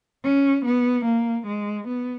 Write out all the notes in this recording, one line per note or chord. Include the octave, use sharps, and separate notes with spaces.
C#4
B3
A#3
G#3
B3